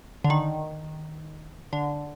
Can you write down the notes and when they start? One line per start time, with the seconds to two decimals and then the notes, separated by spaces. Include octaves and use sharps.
0.24 D3
0.30 D#3
1.73 D3